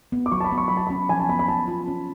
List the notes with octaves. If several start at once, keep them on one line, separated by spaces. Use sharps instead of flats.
B3
D6
F#3 C#6
A5
B5
B3
C#6
F#3 B5
A5
C#4 B5
F3 G#5
A5
B3 B5
B5
B3 A5
F4
C#4